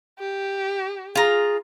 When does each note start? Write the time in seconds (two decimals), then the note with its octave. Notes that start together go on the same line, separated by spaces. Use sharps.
0.19 G4
1.15 F4 G#4 A#5